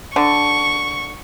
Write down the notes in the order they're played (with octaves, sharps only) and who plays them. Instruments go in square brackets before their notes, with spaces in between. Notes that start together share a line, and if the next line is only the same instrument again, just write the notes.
[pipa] D3 [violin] C#6